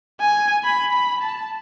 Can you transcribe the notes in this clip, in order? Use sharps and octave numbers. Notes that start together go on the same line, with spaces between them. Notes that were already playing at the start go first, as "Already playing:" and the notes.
G#5
B5
B5
A5